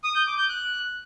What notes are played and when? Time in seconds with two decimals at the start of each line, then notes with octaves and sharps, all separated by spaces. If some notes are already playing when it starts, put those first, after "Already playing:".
0.04 D#6
0.15 G6
0.27 D6
0.38 G6
0.49 F#6